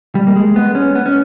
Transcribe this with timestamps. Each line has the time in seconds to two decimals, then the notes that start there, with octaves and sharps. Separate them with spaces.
0.15 G3
0.27 A#3
0.36 G#3
0.56 B3
0.75 C#4
0.95 B3
1.06 C#4